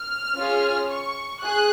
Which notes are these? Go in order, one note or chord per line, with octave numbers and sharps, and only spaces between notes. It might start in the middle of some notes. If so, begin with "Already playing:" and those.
Already playing: F6
C#4 F4 G#4
C#6
G#4 F#6